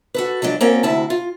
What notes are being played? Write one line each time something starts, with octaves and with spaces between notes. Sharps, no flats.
F#4 A4 B4
F3 F#3 G#3 D4
A#3 C4 C#4 F#4 A#4 D5
D2 C3 E4 F#4 A5
F4